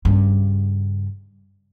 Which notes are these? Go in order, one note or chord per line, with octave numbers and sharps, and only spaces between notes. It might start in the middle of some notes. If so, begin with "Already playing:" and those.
G2 C#3